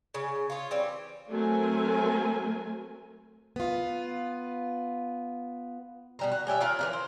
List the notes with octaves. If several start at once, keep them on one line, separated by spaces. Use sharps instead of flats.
C#3
F4 C#5
E3 G3 C4
F#3 A3 C4 A#4 G#5
B3 F4
B2 G3 A#5
F#4
G3 C#4 G4 E5
C#4 F4 A#4 F#5
E3 G3 A#4
C5